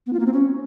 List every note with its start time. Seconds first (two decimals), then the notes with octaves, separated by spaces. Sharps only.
0.06 B3
0.13 F4
0.20 A#3
0.26 C4
0.33 C#4